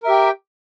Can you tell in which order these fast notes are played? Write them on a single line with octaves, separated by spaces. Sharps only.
A#4 E5 G4 G5